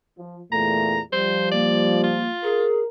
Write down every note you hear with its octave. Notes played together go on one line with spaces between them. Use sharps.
F3
E2 A#2 A3 A#5
F3 G3 C5
A#3 D5
F4
G#4 A#4